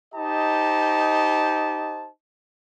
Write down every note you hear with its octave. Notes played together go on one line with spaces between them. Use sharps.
D#4 G4 C5 D#5 A5